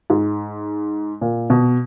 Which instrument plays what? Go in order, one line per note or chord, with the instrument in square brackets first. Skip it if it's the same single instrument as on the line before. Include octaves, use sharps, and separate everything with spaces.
[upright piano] G#2
A#2
B2